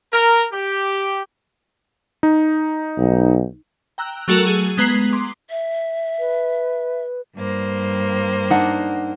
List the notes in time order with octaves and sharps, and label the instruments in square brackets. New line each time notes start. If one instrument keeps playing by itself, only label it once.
[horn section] A#4
G4
[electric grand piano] D#4
[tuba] B1
[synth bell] G5 A#5 E6 F#6
F#3 A3 F#4 A4 A#4
G#4
G#3 B3 B4 A#5 C7
C6 D6
[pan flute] E5
[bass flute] B4
[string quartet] G2 A#3 C5
[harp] D4 D#4 F#5